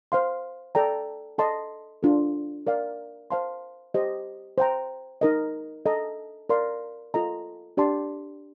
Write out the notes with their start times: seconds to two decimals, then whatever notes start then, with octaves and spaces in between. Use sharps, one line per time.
0.12 C5 F5 C6
0.75 A4 D5 G5 A#5
1.38 A4 D#5 A5 C6
2.03 D4 F4 A4
2.67 A#4 D5 F5
3.31 C5 F5 A5 C6
3.94 G4 C5 D#5
4.58 C5 G5 A#5
5.21 D#4 A#4 D#5
5.86 A4 D#5 A#5
6.49 A#4 D5 F5 C6
7.14 F4 A4 D#5 A#5
7.77 D4 G4 D5 A5 C6